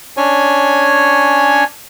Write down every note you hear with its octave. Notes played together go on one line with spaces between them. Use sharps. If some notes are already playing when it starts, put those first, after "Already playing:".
C#4 D4 C#5 G#5